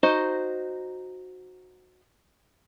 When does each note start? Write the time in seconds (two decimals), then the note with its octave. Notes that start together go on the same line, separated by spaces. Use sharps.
0.03 D#4 F#4 C5 D#5